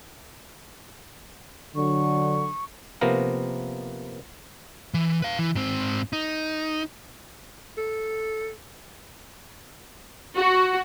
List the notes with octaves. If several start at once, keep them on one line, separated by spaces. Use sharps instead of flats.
D3 F#3 C#6
C3 F3 A#3 B3 A#4
E3
B4 F5
E3
G#2 C4
D#4
A4
F#4